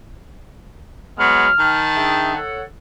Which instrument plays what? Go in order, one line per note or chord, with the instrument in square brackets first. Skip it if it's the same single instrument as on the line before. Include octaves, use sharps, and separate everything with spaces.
[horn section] F#3 G#3 B3 [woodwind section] F6
[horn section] D#3 G5 A5
[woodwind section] D4 G#4 E5
A4 C#5 F#5